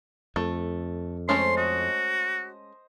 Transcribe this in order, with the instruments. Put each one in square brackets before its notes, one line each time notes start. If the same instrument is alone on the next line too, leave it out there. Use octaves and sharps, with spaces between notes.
[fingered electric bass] F2 [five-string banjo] A3
[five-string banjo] G#3 A3 C#4 [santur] C5 [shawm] C6
[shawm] F#4 [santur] D#5